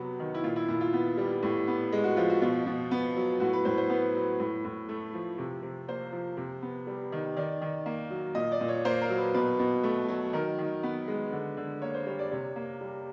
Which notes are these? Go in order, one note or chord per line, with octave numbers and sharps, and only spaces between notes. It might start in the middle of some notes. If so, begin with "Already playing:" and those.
Already playing: C3 F#3 B3 F#4
D#3
E4
A#2 F4
E4
A#2 E4
F4
B3
G3
A2
B3
G#3
F#4
F3 F4
F#4
B2 F4
B2
B3
F#3
A2 F#4
B4
A2 C5
C5
B3 B4
F#3
A2
A2
A3
F3
C3
C3
A#3 C5
F3
C3
B3
G3
D#3
D#3 D5
D#3
A#3
F#3
A#2 D#5
D5
A#2
C#5
A#3 C5
A#4
F#3
B4
B2 B4
B2
A3
F#3
D#3 A#4
D#3
B3 B4
G#3
D3
D3
A#3 C#5
C5
G3 C#5
D5
C3 C#5
A#3
G3